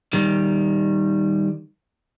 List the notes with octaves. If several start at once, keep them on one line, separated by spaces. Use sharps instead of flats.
D#3 G3